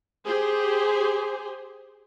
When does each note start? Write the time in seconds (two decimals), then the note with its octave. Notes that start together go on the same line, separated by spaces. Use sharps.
0.24 G4 G#4 C5